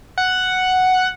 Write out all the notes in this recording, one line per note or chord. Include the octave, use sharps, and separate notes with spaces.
F#5